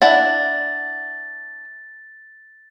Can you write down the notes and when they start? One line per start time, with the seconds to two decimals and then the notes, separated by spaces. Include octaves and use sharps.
0.02 D4 E4 F#5 A6